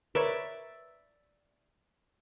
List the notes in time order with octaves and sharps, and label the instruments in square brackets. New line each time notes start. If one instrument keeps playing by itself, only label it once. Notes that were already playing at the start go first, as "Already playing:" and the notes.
[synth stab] A#4 B4 C#5 [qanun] D5 E5